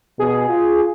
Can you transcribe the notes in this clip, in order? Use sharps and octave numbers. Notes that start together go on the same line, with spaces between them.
B2 G#4
F4